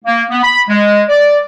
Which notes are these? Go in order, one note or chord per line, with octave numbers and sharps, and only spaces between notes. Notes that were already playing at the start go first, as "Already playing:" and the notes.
A#3
B3
B5
G#3
D5